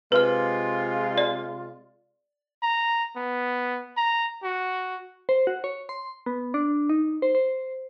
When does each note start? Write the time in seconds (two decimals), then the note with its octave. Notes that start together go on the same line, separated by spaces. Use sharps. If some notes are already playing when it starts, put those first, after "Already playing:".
0.12 C3 G#3 F4 B4 F6
1.18 D5
2.63 A#5
3.16 B3
3.97 A#5
4.43 F#4
5.29 C5
5.47 F#4
5.64 C#5
5.89 C6
6.26 B3
6.54 D4
6.90 D#4
7.22 C5
7.35 C5